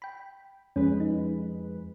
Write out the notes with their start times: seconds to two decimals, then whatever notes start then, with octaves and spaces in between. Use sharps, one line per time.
0.02 G5 B5
0.76 F2 G#3 C#4 B4
1.00 D#4